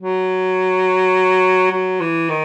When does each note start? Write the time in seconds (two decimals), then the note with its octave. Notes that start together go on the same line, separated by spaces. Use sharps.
0.01 F#3
1.72 F#3
2.01 E3
2.30 D#3